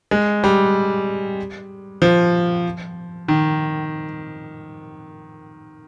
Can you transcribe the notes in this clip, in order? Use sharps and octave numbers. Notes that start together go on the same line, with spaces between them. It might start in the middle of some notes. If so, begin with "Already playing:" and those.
G#3
G3
F3
D#3